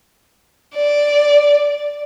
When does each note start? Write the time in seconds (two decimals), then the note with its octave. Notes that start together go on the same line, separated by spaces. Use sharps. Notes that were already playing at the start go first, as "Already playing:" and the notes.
0.75 D5